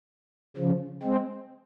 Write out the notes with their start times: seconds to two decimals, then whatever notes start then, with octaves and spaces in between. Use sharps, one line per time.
0.57 C#3 F3
1.03 G#3 C4